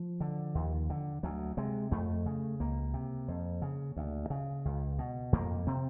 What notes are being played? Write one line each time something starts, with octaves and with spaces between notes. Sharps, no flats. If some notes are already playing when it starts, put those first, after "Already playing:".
Already playing: F3
D3
D#2
D3
D2 F#3
C3 G#3
F2 A3
C#3
C#2 A#3
C3
F2
C#3
D2
C#3
C#2
B2
F2 A#3
C3 C4